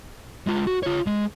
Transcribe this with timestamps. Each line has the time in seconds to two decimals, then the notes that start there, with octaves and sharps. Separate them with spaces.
0.47 G#3 F4
0.67 F#4
0.83 F4 C#5
1.07 G#3